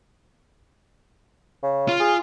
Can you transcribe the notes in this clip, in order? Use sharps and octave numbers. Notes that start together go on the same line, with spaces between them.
C#3
F4
G#4